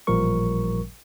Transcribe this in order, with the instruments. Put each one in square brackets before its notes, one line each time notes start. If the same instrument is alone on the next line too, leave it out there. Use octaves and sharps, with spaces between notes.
[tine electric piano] A1 A#2 F3 G3 A#4 C#6